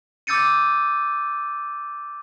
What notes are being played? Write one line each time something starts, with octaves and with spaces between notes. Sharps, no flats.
D6 E6 G6 A6 C#7 D#7